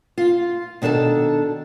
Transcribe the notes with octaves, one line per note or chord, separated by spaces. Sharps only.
F4
B2 D#3 D4 A4 A5